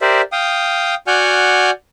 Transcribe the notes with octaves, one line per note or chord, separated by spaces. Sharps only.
G4 A#4 C5 D5 E5
F5 G5 D#6
F#4 D5 F#5 G#5 F6 G6